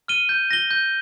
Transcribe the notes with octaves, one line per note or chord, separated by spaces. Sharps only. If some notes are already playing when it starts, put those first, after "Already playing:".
F6 D#7 G7
G6
A#6 G7
G6